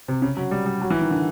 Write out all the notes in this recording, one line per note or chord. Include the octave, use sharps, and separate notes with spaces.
C3
C#3
F#3
G3
G3
F#3
E3
D#3
D3